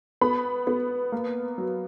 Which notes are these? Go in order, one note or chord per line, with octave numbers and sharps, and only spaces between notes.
B3 B5
B3
A#3
F#3